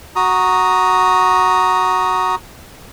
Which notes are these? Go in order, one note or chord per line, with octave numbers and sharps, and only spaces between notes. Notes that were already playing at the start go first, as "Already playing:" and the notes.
F#4 A#5 D#6